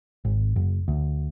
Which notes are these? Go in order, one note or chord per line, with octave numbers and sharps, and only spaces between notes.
G#1
F#1
D2